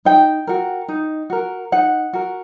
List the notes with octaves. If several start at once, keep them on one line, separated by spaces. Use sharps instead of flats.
D#4 G5
F#4 A#4
D#4
F#4 A#4
D#4 F#5
F#4 A#4